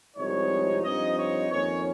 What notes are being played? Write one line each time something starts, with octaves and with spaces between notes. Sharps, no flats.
C2 C3 F3 G#3 D#4 C#5
G2 F3 C4 D#4 D#5
C#5
F2 D#3 A#3 C#4 C#5